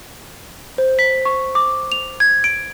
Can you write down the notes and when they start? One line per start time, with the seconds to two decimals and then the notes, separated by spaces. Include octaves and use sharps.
0.78 C5
0.99 B6
1.25 C#6
1.55 D6
1.92 F7
2.20 G#6
2.44 D7